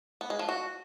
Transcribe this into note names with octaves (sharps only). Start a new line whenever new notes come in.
B3
G#3
F3
F#4